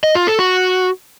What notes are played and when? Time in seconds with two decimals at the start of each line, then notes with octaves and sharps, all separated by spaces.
0.04 D#5
0.15 F4
0.27 A4
0.39 F#4